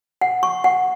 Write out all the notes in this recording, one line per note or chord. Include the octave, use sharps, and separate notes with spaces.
F#5
C#6
F#5